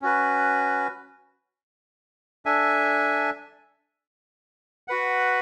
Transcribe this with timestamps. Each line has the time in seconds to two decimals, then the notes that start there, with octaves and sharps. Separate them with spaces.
0.02 C#4 F#4 B4
2.46 D4 A4 E5 G#5
4.88 F#4 B4 F#5